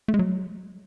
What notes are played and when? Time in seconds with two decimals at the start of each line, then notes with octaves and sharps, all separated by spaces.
0.08 A3
0.14 G#3
0.19 F#3